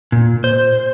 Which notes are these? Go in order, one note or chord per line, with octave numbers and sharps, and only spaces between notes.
A#2
C5